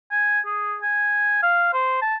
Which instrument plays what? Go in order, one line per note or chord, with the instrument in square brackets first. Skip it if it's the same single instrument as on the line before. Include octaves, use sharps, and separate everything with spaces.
[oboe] G#5
G#4
G#5
F5
C5
A5